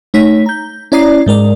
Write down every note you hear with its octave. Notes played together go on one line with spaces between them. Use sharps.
A3 D#4 C#5 B6
A#5 G6
C#4 E4 D5 A#5 D#6 C7
G#2 G#3 A#4 D5